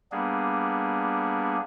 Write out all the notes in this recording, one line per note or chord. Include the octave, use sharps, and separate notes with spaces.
G3 A#3 B3 D4 G#4